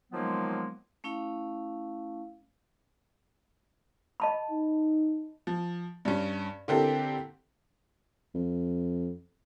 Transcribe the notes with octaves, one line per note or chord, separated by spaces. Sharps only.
D#3 F3 F#3 G#3 A#3 B3
A3 C#4 E4 F5
D#5 A5 B5
D#4
F3
G2 C#4
D3 A#3 C4 E4 G4 A4
F2